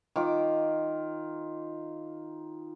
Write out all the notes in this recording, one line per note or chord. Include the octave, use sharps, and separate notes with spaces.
D#3 F4 D6